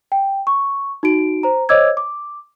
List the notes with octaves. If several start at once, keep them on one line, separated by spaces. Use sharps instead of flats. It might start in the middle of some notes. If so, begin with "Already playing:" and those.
G5
C#6
D#4 F#4 D7
C5 A#5
C5 C#5 D#5 D6 E6 G#6
D6